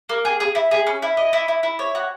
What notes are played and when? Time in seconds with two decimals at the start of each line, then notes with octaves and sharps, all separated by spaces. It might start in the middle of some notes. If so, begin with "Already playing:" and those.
0.09 A#3
0.25 G#4
0.40 G#4
0.55 E4
0.71 G#4
0.87 C#4
1.02 E4
1.17 D#5
1.33 E4
1.48 E4
1.63 E4
1.79 C#5
1.95 F#4